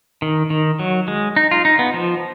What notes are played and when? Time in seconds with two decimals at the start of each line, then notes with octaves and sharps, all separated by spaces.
0.22 D#3
0.50 D#3
0.79 F#3
1.08 G#3
1.36 D#4
1.51 F4
1.65 D#4
1.79 B3
1.94 F3